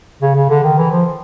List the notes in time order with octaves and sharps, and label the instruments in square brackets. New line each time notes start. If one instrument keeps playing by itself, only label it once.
[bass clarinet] C#3
C#3
D3
D#3
E3
F3